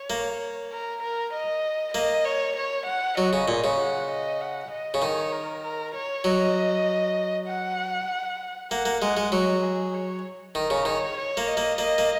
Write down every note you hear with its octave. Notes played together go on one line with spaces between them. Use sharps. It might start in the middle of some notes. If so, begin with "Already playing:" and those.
Already playing: C#5
A#3
A#4
A#4
D#5
A#3 D#5
C#5
C#5
F#5
F#3 D#5
C#3
A#2
C#3
F#5
D#5
F#5
D#5
C#3
D#3 C#5
A#4
A#4
C#5
F#3 D#5
F#5
A#3 F#5
A#3
G#3 F#5
G#3
F#3 D#5
G#4
C#5
D#3 A#4
C#3
D#3 C#5
C#5
A#3
D#5
A#3
A#3 D#5
A#3